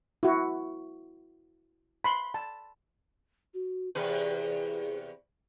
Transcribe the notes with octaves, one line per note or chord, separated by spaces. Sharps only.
E4 F#4
B5 C6
A5
F#4
E2 C3 G#4 B4